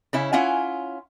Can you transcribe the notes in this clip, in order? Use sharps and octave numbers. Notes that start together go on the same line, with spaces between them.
C#3 C#4 E4
C#4 E4 F4 F#5 G#5